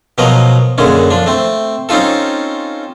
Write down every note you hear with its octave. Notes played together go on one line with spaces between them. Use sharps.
B2 F3 F#3 A#4 D#5
F#2 A#2 D3 G#3 C#4
F3 D4
A3 C4
C4 C#4 D#4 F4 A4